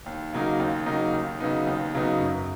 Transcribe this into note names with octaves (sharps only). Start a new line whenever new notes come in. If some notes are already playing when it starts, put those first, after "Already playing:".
D#2
C#3 F#3 A#3 D#4
D#2
C#3 F#3 A#3 D#4
D#2
C#3 F#3 B3 D#4
D#2
C#3 F#3 B3 D#4
F#2